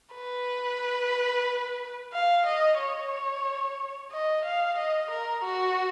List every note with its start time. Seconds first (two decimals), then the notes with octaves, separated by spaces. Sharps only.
0.15 B4
2.14 F5
2.46 D#5
2.80 C#5
4.12 D#5
4.45 F5
4.78 D#5
5.11 A#4
5.44 F#4